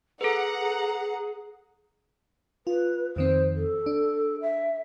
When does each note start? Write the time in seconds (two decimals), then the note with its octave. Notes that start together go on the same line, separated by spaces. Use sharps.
0.21 G#4 A4 B4 F#5 A#5
2.67 F4 B4
3.16 F2 D#3 C4 C5
3.55 A4
3.86 D4
4.42 E5